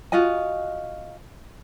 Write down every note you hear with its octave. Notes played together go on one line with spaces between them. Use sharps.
F4 F#4 D#5 G#5